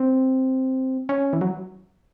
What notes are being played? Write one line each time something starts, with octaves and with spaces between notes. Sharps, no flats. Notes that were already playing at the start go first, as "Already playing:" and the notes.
Already playing: C4
C#4
E3
F#3